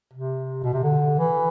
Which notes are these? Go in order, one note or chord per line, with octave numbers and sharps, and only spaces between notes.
C3
B2
C3
D3
E3